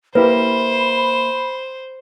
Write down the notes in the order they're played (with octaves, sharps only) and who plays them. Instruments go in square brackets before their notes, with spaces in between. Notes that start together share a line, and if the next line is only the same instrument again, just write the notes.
[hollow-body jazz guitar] A#3 E4 G4 [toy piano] B4 [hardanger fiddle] C5 [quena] B5